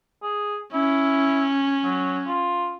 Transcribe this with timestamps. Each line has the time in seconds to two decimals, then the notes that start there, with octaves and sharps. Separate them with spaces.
0.22 G#4
0.73 C#4 E4
1.84 F#3
2.27 F4